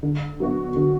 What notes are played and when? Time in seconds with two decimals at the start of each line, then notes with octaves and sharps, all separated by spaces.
0.03 D3
0.40 F#3 B3 F#4
0.76 D3